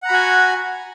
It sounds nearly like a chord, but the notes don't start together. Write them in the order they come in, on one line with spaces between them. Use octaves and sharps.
F#5 A#5 B5 F#4 G#5